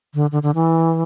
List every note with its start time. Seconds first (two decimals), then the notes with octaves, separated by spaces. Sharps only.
0.14 D3
0.32 D3
0.43 D3
0.55 E3